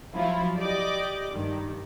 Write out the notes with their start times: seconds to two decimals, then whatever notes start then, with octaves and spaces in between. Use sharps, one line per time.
0.14 F3 F#3 E4 F4
0.57 G4 D5 D#5 D6
1.32 G2 D#3